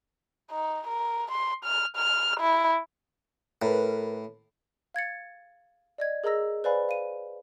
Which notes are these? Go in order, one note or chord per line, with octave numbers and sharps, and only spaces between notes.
D#4
A#4
C6
F6
F6
E4
A2 A#4 B4
F5 G#6 A6 C#7
D5 D#5 G#6
G#4 A#4 D#5 A#5 E6 A#6
B4 C5 D5 F5 G#5 B5
F5 D#7